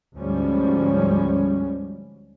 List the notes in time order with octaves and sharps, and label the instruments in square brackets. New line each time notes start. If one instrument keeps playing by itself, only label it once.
[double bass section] D2 G#2 F3 G3 C#4